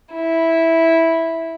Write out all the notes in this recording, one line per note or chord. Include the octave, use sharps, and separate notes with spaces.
E4